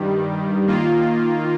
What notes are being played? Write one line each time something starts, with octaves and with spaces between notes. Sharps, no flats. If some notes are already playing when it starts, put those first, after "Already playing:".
Already playing: G2 D#3 G3
D#3 A#3 F4